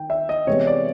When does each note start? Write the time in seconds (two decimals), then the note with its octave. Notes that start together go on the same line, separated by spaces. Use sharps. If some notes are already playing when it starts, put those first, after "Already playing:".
Already playing: D#3 G5
0.10 E5
0.29 D#5
0.47 C3 E3 G#3 B3 C#5
0.67 D5